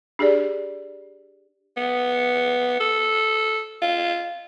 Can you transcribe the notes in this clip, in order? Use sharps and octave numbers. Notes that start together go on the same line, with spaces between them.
D4 G4 G#4 D5
B3
A4
F4